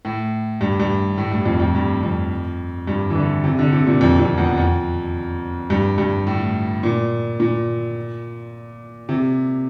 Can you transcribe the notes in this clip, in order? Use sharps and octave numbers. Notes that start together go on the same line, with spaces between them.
A2
G2
G2
A2
G2
F2
F2
G2
F2
G2
E3
D3
C3
D3
C3
A#2
F2
F2
E2
F2
G2
G2
A2
A#2
A#2
C3